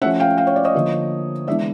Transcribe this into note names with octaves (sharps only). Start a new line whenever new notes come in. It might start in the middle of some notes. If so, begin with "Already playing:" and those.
F3 A3 C#4 E5 F#5
F5 G5
F5 G5
C#5
D5
C#5 D#5
D3 F3 A#3
E3 G#3 B3 D4 D5 E5